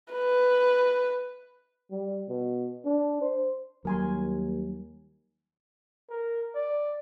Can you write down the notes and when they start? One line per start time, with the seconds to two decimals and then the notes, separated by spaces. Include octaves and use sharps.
0.12 B4
1.91 G3
2.29 B2
2.84 D4
3.22 C5
3.85 D#2 F#3 G3 A#4 G#5 C6
6.10 A#4
6.55 D5